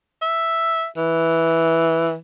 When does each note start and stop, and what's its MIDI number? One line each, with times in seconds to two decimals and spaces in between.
0.22 0.86 76
0.97 2.15 52